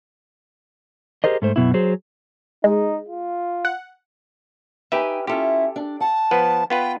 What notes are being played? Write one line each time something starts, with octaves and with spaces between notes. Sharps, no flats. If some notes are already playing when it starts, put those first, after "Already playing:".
G4 G#4 A#4 C5 D#5
G#2 A3 C5
F#2 B2 E4
F#3 G#4 C5
G#3 D#4
F4
F#5
D#4 G4 B4 E5 G5 G#5
C#4 E4 F4 G4 A4
D4
F#5 A5
F3 B3 B4
B3 F4 B4 G5